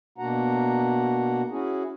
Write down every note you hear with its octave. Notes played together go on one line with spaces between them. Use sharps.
B2 A#3 D4 F#4 F#5 A#5
C#4 E4 F#4 G#4